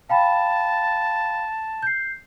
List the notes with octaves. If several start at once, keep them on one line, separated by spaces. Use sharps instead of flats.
F5 G5 A5 B5
G6 C7